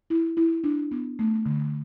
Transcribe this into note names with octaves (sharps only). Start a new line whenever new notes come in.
E4
E4
D4
B3
A3
D3